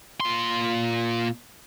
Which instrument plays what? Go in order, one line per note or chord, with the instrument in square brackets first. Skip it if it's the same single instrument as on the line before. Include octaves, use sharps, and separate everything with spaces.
[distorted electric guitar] A#2 C6